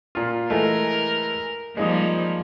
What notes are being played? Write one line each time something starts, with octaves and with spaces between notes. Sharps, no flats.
A#2 F4
E3 G#3 A3 A#4
F3 G3 G#3 A#3 D#4 D#6